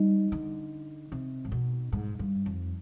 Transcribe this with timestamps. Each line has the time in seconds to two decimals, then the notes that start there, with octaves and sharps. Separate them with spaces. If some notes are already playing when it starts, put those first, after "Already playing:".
Already playing: G3 D#4
0.32 D3
1.12 C3
1.45 G#2
1.52 B2
1.92 G#2
2.19 G2
2.46 F2